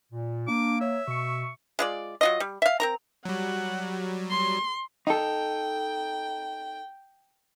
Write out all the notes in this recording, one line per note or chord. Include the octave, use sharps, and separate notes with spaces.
A#2
A#3 D4 D6
C#5 E5
B2 C#6
G#3 F4 D5
F#3 F4 D#5
G3
E5 F5
C4 A#4 A#5
F#3 G3 F#5
C6
D#4 A4 G5